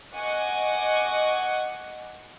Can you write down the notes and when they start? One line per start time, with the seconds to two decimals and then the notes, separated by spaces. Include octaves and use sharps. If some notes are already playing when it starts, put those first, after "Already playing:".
0.14 D#5 F#5 G#5 C#6 D6